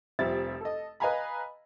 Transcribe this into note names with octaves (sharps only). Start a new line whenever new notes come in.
F1 F3 G3 C4 E5 A6
A4 D#5
B4 D#5 F5 G#5 A#5 B5